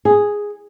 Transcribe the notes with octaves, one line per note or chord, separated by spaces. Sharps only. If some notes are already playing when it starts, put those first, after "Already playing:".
G#4